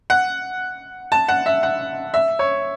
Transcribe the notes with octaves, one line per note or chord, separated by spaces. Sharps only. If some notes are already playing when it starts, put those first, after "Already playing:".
F#5
A5
F#5
E5
F#5
E5
C#5